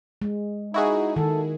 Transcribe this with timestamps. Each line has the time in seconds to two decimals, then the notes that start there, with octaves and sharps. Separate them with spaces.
0.22 G#3
0.74 D#4 E4 F#4 G#4
1.16 D#3 A4